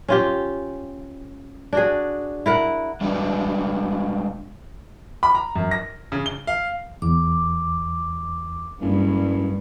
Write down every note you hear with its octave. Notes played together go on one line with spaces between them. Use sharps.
C#4 F4 G4
D4 F#4 G#4
E4 A#4 F#5
G3 G#3 D4 F#4 B4 D5
B5
A#5
F#2
A#6
C#3
G7
F5
E2 D6
F#1 G2